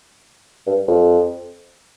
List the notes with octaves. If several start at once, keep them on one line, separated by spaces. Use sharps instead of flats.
G2
F2